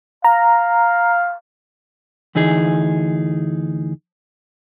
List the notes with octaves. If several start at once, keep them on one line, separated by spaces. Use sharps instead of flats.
F5 A#5
D2 E3 D#4 G#4